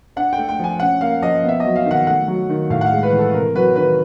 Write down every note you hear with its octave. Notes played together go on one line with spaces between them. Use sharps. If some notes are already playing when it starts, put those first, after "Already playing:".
D4 F#5
G5
A3
G5
F3 G#5
C#4 F#5
A#3 F5
F3 D#5
B3
E5
F#3 D#5
F5
D#3
F#5
A3 F#5
F#3
D#3
A2 F5
F#5
F5
G#3
B4
E3
A4
C3 A#4
F#3 B4
D#3 B4